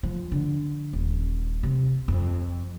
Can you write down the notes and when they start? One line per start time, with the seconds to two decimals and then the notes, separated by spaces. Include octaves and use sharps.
0.03 F3
0.32 D3
0.93 D#1
1.63 C3
2.08 F2